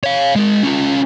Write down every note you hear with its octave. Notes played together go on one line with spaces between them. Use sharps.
C#5 F5
G#3 A#4
C#4 F4